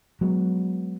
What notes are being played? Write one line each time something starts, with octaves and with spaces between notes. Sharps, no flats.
F#3 G#3 B3